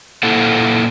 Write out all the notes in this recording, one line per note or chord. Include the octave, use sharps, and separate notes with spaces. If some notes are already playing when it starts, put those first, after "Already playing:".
A#2 A#3 E4 A4 F#5